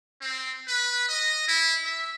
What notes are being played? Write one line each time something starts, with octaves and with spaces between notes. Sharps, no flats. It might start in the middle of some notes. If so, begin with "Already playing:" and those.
C4
B4
D#5
E4
E5